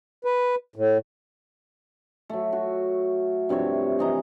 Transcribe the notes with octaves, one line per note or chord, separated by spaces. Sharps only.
B4
A2
F#3 A3
F#4
G2 C3 F3 C#5
E3 D#5 A#5